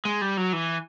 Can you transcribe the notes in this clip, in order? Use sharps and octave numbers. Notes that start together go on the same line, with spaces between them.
G#3
G3
F#3
E3